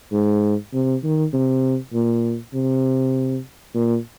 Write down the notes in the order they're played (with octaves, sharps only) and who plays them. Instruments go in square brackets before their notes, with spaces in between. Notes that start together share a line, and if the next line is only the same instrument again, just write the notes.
[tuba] G#2
C3
D#3
C3
A#2
C3
A#2